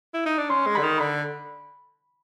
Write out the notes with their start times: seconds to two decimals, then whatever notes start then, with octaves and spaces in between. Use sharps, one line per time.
0.14 E4
0.26 D#4
0.38 D4
0.50 C#4 C6
0.66 G#3
0.75 D3 B5
0.83 D#3
1.00 D3 B5